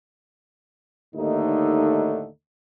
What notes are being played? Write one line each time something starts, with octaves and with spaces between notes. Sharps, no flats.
D#2 A2 D3 A3 D#4